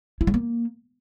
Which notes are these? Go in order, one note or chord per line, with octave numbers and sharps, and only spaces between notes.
E4
G#3
A#3